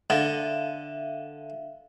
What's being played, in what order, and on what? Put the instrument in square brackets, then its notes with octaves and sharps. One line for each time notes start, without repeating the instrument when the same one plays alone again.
[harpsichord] D3 [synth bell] E5 F5